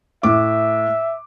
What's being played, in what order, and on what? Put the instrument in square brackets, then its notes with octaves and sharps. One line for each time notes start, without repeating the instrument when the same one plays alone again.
[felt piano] A2 D6 [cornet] E5